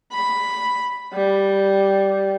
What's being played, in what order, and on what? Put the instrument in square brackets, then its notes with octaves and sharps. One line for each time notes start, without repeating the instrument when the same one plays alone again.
[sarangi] B5
G3